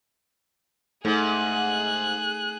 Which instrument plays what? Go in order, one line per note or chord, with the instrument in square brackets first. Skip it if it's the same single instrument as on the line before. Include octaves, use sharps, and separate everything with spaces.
[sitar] G#2 [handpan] A3 [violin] G#4 F#6